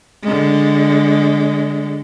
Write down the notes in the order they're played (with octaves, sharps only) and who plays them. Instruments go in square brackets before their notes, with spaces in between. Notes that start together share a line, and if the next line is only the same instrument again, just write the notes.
[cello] D3 G#3